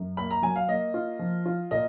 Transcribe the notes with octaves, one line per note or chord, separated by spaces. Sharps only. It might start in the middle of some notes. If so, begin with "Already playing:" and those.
Already playing: F#2
A#3 B5
A#5
F#3 G#5
F5
A#3 D#5
F4
F3
F4
A#2 D#5